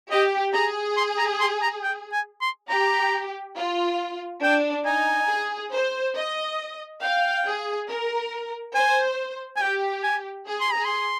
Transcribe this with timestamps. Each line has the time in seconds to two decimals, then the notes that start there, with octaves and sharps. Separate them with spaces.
0.11 G4 D#5
0.54 G#4 A#5
0.97 C6
1.18 A#5
1.40 C6
1.62 A#5
1.83 G5
2.12 G#5
2.41 C6
2.69 G4 A#5
3.56 F4
4.42 D4 G5
4.86 D#4 G#5
5.29 G#4
5.72 C5
6.15 D#5
7.01 F5 G5
7.45 G#4
7.88 A#4
8.74 C5 G#5
9.57 G#5
9.60 G4 G5
10.03 G#5
10.47 G#4
10.61 C6
10.73 G#4 A#5
10.85 C6